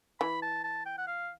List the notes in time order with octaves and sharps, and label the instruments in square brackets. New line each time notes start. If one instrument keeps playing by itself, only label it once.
[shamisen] E3 [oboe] B5
[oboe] A5
A5
G5
F#5
F5